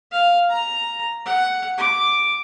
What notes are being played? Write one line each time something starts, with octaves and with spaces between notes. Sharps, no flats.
F5
A#5
F#5
D6